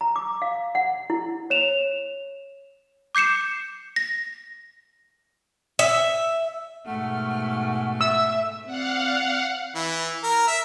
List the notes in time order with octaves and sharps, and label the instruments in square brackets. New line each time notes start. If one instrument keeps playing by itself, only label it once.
[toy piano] A#5
D6
F5
F#5
E4
[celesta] C#5 E7 F7
[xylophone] D6 G6 C7 C#7 E7
A#6
[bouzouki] E5
[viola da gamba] G#2 B2 A3 [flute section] F#5 C#6 F6
[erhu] E5 [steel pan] E6
[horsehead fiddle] C4 D5 [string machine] F5 F#5
[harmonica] E3
A#4
E5